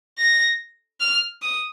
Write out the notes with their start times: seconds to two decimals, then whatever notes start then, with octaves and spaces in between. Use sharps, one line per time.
0.18 A#6
1.00 F6
1.42 D#6